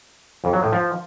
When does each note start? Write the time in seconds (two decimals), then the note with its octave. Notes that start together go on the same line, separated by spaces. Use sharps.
0.44 F2
0.53 F#3
0.63 A2
0.72 F3